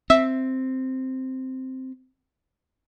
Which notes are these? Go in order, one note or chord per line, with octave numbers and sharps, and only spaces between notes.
C4 E5